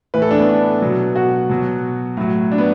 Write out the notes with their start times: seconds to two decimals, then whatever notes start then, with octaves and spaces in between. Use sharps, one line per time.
0.14 A2 E3 B4
0.22 A4
0.31 D4
0.39 B3
0.48 D4
0.82 B2 F#3
1.16 F#4
1.50 B2 F#3
2.17 A2 F#3
2.52 D4
2.58 B3